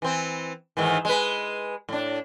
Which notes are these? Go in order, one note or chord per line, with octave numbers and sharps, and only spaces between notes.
E3 C4
G#2 D#3 E3
G#3 B4
A2 D4